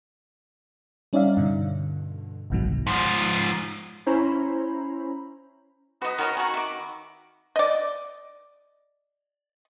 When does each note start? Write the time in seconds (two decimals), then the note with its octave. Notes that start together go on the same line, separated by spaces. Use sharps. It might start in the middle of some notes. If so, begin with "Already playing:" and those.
1.13 G3 C#4 D#4 D5 E5 F5
1.37 G2 B2 D3
2.50 G1 C2 G#2 B2 D#3 F#3
2.87 G#2 F3
4.06 C#4 E4 C5 C#5 A#5 B5
6.02 D#4 F#4 B4 D#5 D#6
6.18 D#3 F#4 A#4 C#5 D#5
6.37 F#4 G#5 A#5
6.54 E5 D6
7.56 D5 D#5